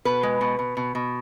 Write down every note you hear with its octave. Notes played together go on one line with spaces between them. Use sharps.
B2 B4
G#3
B2
B2
B2
B2